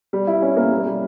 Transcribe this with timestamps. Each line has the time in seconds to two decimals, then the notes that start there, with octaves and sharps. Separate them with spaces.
0.13 G3
0.27 E4
0.42 C#4
0.57 A#3
0.71 G3
0.86 G3